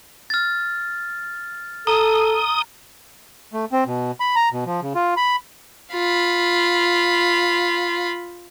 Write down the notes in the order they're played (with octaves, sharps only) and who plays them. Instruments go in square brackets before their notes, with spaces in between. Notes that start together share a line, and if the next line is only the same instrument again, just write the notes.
[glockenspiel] F6 A6
[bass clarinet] A4 [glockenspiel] A#5 [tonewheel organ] D#6
[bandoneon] A3
C4
B2
B5
A#5
B2
F3
C#3
F4
B5
[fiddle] F4 B5